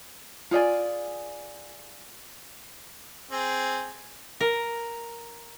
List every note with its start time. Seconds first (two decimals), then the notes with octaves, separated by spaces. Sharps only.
0.51 F4 G#4 D5 G#5
3.31 C4 G#4
4.40 A#4